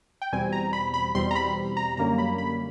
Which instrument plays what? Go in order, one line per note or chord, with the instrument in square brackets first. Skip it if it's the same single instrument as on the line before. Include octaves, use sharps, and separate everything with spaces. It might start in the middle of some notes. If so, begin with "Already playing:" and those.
[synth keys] G5
E2 B2 G3 C4 G#5
A#5
B5
B5
E2 B2 G3 C4 C6
A#5
B5
A#5
F#2 D3 G3 A#3 C#4 A#5
B5
B5